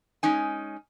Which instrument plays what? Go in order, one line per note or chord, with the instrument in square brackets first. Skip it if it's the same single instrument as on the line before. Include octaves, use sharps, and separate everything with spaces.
[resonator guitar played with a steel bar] G#3 C#4 D#4 G#5